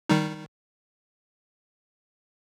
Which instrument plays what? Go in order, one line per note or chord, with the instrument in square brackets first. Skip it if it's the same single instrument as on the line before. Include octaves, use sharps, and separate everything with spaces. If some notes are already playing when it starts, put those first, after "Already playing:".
[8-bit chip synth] D#3 G3 D#4